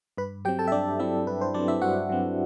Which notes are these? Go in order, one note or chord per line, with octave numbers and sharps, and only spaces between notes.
G2 B4 B5
F#3 C4 G4 G5
A4 A5
E5
G2 D4 D5
F#3 C4 E4 E5
G2 B4
C5
F#3 C4 D4 D5
E4 E5
G2 F#4 F#5
F#3 C4